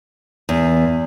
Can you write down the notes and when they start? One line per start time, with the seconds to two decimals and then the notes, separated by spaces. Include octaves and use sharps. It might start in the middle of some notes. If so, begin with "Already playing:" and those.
0.49 E2